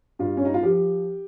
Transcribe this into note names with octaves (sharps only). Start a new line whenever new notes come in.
G2 F4
C#4
D#4
F4
F3 G4